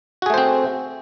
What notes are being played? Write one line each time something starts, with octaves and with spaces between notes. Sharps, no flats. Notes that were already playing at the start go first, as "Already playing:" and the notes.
A3 C4 F#4 G#4 C5